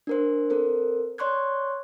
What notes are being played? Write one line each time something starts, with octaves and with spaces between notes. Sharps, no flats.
D4 A#4 C5
C4 A4 A#4 C5
C#5 D5 C6 C#6 F#6 G#6